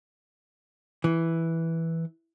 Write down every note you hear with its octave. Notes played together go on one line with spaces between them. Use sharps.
E3